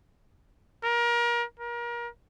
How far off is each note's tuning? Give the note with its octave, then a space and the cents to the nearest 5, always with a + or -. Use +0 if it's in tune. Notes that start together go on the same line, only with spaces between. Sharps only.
A#4 +30
A#4 +30